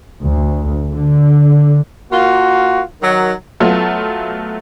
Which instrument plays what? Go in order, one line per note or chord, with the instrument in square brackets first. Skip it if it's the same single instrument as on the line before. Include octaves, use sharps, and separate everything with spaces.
[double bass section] D2
D3
[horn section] A#3 F4 F#4
D#3 F#3
[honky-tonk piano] F#3 A3 B3 F4